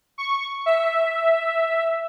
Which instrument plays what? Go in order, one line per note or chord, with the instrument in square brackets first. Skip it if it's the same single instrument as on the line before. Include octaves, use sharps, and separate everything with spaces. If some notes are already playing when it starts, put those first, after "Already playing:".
[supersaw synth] C#6
E5